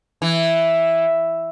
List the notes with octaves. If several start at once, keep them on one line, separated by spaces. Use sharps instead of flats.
E3